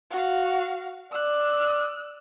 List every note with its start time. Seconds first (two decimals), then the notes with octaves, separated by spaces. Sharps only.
0.10 F#4 F5
1.12 D5 E6 F#6